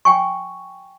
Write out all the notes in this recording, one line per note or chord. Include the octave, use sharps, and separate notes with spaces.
G5 G#5 C#6